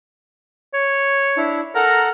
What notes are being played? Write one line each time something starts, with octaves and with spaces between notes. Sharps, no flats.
C#5
D4 E4
A4 A#4 F#5 A#5